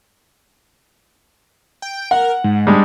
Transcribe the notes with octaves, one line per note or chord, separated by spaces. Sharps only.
G5
A#4 F#5
G#2
G3 G#3 D4